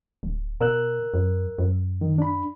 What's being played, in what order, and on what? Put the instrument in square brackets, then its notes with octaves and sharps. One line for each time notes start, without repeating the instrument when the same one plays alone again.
[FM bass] D1
[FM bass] B2 [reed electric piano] A#4 E6 F#6
[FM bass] F#2
F#2
[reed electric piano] D#3
D4 B5